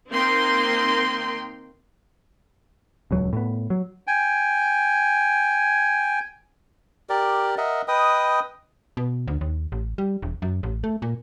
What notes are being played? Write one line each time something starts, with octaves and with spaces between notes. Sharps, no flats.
D#3 A#3 C4 D#4 G5 C6
D#1 C#2 F#3
A2 B3
F#3
G5 G#5
G4 A#4 D5
A#4 D#5 E5 F#5
B4 D#5 G5 D#6
B2
D2
D#2
A1
G3
E1
F#2
A1
A3
A#2